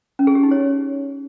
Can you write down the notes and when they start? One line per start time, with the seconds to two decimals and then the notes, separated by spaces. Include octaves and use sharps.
0.19 C#4
0.27 G#4
0.35 G4
0.43 D#4
0.51 C#5